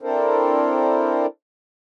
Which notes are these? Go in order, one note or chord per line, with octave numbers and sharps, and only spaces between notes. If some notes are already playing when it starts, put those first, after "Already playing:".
C4 D4 E4 A4 A#4 C5